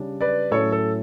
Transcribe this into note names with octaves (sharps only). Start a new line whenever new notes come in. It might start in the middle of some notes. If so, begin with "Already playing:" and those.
Already playing: C#3 G3 D4
B4 D5
A2 F#3 C#4 E4 A4 C#5
A4